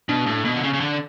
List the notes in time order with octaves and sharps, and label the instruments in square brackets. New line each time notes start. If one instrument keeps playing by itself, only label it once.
[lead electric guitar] B2 [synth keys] D4
[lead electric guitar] A2
[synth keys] D4
[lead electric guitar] B2
D3
C#3
C#3
D3